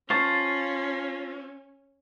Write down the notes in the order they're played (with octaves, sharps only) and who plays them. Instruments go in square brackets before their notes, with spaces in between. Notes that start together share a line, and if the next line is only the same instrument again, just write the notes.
[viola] C#4 [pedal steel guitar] F4 C5 A5 [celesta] C#6 C7